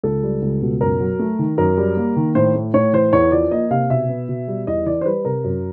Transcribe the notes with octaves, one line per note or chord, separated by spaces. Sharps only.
C#2 A4
G3
C#2
B2
F#2 A#4
F#3
A3
D#3
F#2 A#4
G3
A#3
D#3
A2 C5
A3
A2 C#5
E3 C5
E2 C#5
F3 D5
A#3 D#5
C3 F5
B2 E5
B3
B2
G3
E2 D#5
E3 D5
C5
G3 B4
C3 A#4
F#2